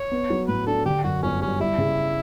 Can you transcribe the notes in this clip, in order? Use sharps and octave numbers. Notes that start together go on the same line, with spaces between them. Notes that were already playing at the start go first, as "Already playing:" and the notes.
Already playing: C#5
B3
F#3
A2 B4
D4 A4
D3 G4
F#2 F#4
G1 C#4
G3 C#4
G3 E4
C#3